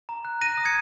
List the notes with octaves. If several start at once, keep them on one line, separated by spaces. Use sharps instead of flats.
A#5
F#6
F#6 A#6 D#7
D#6
G#6 C#7